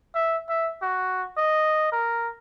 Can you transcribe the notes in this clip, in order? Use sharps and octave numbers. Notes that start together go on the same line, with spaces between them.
E5
E5
F#4
D#5
A#4